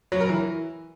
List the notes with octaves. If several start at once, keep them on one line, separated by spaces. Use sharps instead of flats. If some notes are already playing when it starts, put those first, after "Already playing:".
F#3
A#4
E3